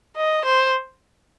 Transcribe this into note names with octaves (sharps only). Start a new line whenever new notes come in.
D#5
C5